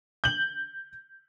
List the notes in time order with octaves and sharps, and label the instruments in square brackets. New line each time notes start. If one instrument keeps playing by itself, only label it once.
[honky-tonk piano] G6 F#7